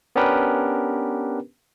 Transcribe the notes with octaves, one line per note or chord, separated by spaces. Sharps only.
B3 C#4 D4 G4 A#4 B4